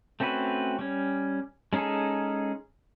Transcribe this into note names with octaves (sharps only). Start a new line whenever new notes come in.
A3 C4 C#4 F#4 B4
G3 C#4
G#3 C#4 D#4 G#4 A4